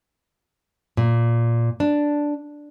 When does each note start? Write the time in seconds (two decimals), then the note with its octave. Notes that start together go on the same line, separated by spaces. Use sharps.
0.97 A#2
1.80 D4